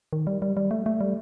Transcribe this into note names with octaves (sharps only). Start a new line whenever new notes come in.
D#3
G3
G3
G3
A3
A3
G3